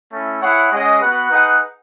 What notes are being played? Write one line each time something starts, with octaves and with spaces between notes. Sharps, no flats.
A3 C#4 E4
E4 G#4 C#5 F#5
G#3 C#4 G#4 D#5 F#5
B3 F#4 B4 F#5
D#4 G#4 B4 F#5